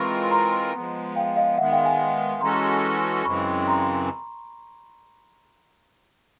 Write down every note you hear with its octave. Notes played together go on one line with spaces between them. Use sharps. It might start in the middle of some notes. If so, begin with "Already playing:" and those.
Already playing: E3 G#3 C4 F4 A#4 B5 C#6
A#5 C6
F3 G#3 B3
F5 G5
D#5 F5
D#3 G#3 B3 E5 F#5
F5 G5
F#5 G#5
E3 G#3 C#4 F#4 A4 A#5 C6
F#2 C#3 E3 G#3 C4 B5 C#6
A#5 C6